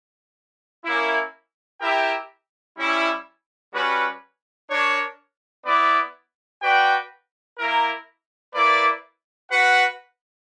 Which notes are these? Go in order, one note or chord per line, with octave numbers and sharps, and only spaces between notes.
A#3 C#4 E4
E4 G4 A#4 E5 G5
G3 C#4 E4
G3 C#4 F#4 B4
D4 A#4 C#5
B3 E4 B4 D5
F#4 B4 D5 G5
A#3 E4 A#4
A#3 E4 B4 D5
F#4 B4 F#5